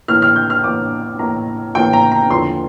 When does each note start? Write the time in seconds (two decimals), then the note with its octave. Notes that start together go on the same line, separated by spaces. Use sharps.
0.08 A2 E3 A#3 F6
0.22 F6
0.36 G6
0.50 F6
0.64 A2 E3 A#3 D6
1.19 A2 E3 A#3 A#5
1.75 A2 E3 A#3 G5
1.93 A#5
2.12 A#5
2.30 E2 D3 F3 A#3 C6